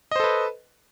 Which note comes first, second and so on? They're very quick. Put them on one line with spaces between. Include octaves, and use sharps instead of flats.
D#5 C5 A4 B4